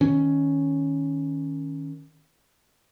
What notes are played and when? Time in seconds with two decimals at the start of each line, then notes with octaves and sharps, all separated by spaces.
0.01 D#3 C#4